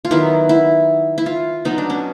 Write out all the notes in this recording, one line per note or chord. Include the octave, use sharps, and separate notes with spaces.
F4
D#3 F#3 B3 E4
E4
E4
F4
B2 F#3 B3 D#4
D4
C#4